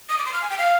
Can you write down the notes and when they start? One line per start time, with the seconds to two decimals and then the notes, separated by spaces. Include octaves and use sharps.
0.09 D#6
0.19 D6
0.25 C6
0.33 F6
0.42 G#5
0.50 G5
0.58 F5